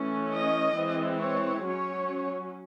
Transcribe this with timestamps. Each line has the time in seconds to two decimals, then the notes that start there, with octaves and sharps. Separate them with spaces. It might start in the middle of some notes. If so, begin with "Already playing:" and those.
Already playing: E3 A3 C#4
0.32 D#5
0.76 E3 G#3 C4
1.20 C#5
1.64 F#3 C#4 C#5